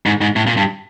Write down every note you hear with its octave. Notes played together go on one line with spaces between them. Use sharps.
G#2
G#2
A2
A#2
G2